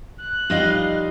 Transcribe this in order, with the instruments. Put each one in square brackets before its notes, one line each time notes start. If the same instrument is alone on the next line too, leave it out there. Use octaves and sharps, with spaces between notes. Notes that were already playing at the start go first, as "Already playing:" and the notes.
[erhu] F#6
[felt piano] F3 G3 D#4 [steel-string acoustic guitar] F4 D#5 F5